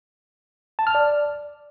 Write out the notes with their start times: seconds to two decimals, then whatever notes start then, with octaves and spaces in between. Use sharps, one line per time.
0.79 A5
0.87 F6
0.95 D5